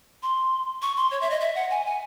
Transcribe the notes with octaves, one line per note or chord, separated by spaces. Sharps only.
C6
C#6
C6
C#5
E5
D#5
E5
F#5
G#5
G#5